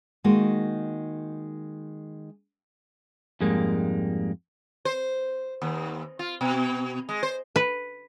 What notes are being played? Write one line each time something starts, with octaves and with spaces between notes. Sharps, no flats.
D#3 G#3 A#3 D#4 F#4
F2 G#2 G3 G#3 A#3
C5
D#2
F4
B2
G#3
C5
B4